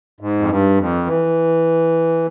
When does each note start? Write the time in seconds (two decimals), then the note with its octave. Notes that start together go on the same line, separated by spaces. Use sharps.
0.20 G#2
0.39 F2
0.49 G2
0.78 F2
1.06 E3